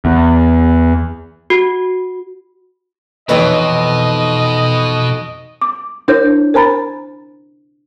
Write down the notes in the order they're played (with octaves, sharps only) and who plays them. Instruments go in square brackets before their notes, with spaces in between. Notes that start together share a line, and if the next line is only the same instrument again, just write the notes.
[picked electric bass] E2
[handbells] F#4
[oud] F2 D#4 C#5 [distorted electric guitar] B2 [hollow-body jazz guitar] E3 B4 [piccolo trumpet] D#5
[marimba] D6
D4 E4 A#4 C5 C#5 G6
A#4 C5 G#5 A#5 B5 A6